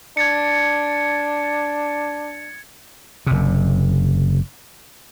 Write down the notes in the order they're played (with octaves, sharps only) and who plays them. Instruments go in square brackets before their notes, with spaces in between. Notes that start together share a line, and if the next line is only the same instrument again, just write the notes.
[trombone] D4 [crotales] G#6 A6 C#7
[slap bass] F#1 C3